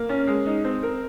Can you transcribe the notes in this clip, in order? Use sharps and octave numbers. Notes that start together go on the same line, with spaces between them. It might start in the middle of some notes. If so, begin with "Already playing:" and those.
Already playing: A#3
C#4
G#3
D#4
C4
A#4